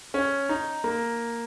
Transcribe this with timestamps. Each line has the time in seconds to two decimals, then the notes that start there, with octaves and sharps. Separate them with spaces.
0.14 C#4
0.49 D#4
0.84 A#3